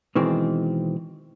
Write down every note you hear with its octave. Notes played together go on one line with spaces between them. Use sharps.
B2 D#3 E3 G#3 C4